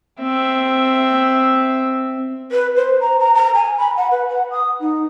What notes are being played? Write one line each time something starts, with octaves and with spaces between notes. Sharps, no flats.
C4 E5
B4
C5
A#5
A#5
A#5
G#5
B5
F#5
B4
F#5
D#6
D#4